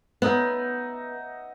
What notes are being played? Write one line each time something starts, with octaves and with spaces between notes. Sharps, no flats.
B3 D#4 E5 F#5